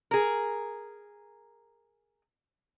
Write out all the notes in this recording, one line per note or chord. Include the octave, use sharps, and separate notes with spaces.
G#4 A#4